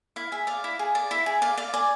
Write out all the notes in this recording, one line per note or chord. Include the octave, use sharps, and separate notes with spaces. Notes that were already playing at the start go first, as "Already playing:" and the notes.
E4 F5
G#4 E5
D5 F5
E4
G#4
D5
E4 E5
G#4
D5 F5
D5 F5
D5 G#5